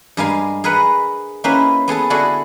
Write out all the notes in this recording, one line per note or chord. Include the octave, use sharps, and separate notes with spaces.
G2 G#3 G#4 A#4 F5 G#5
G#4 A#4 B4 D#5 F#5
A#3 C#4 D#4 E4 B4 C5
B3 G#4 A4 A5
D3 D4 E4 F#4 G#4 A4